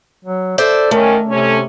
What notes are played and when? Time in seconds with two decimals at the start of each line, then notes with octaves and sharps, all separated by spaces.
0.25 F#3
0.58 A4 C5 D5 E5
0.91 D#3 A3 C#4 A#4
1.29 C3 C#4 A4